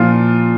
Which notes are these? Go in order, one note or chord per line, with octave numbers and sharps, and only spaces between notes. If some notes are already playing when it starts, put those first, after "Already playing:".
Already playing: A#2 F3 F4